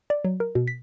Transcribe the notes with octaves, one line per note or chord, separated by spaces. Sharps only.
D5
F#3
A#4
B2
B6